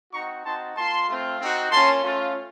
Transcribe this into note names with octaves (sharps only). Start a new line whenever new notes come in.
C4 D#4 F#4 A#5 C#6
C4 D#4 F#4 A5 C6
A#3 F4 A5 C6
A3 C4 F4
C4 D#4 F#4
A#3 C#4 F4 A5 C6
A3 C#4 F4